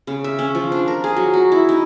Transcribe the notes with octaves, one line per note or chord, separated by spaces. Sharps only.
C#3
E5
C#4
F3
D4
A#4
G#4
F#3
F#4
E4
D#4